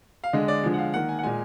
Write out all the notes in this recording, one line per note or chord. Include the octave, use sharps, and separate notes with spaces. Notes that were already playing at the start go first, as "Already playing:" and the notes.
F5
D3 G#3 D#5
D5
D3 F3 G#3
F#5
F5
D#3 A#3 F#5
G#5
F#5
A#2 G#3 G#5